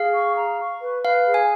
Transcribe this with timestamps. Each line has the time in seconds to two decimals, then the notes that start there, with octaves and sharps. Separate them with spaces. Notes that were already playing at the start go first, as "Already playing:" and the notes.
Already playing: G#4 F5
0.14 C#6
0.37 A#5
0.60 C#6
0.81 B4
1.04 B4 F5
1.27 G#4
1.34 G#5